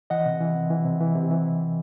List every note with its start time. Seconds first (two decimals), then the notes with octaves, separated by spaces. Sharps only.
0.10 E3 D#5 F#5
0.26 C3
0.41 E3
0.55 C3
0.70 E3
0.85 C3
1.01 E3
1.15 C3
1.31 E3